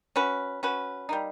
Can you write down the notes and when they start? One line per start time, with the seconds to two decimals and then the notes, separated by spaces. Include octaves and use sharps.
0.16 C#4 F#4 B4
0.63 C#4 F#4 B4
1.09 G3 A#3 D#4